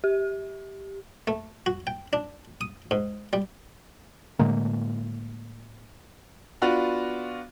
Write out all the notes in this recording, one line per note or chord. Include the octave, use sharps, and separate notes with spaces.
G4
A3
F#4
G5
D4
D#6
G#2
G3
A2 D3 G#3 A#3
B3 D4 F4 F#4